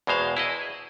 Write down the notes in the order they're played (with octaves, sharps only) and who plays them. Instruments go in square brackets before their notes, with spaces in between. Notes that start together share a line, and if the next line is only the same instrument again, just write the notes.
[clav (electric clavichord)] E2 B2 G#3 C5 F5
E4 G#4 D#5